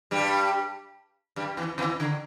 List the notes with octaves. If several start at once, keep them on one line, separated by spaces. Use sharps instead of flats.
G2 G3
G2 G3
E2 E3
E2 E3
D3